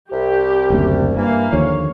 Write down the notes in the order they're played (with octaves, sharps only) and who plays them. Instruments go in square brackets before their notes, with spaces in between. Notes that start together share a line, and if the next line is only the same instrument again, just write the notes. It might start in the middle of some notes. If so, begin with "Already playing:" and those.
[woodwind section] C2 [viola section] G4
[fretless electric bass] F#1 D2 C3
[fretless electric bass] G2 [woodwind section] E3 [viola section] A#3 F5
[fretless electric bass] D#2 D3 F3 [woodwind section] C#5